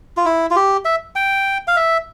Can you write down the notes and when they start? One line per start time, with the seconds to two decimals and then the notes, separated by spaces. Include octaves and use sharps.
0.17 F4
0.25 E4
0.51 F4
0.56 G4
0.85 E5
1.16 G5
1.68 F5
1.76 E5